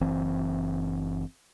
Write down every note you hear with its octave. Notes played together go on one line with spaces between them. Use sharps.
F#1 E3 C4